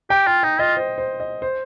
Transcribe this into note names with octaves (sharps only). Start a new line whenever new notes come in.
G4 G5
F4 G5
D#4 G5
F4 D#5
C5
C5
D#5
C5